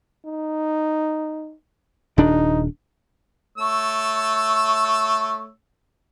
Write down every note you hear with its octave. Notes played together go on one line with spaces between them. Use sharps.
D#4
D#1 D4 D#4
A3 C#5 E6